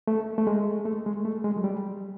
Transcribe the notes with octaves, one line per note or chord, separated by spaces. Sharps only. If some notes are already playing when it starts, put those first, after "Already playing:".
A3
A3
G#3
A3
G#3
A3
G#3
F#3
G3